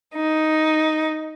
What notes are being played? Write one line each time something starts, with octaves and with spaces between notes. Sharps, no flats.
D#4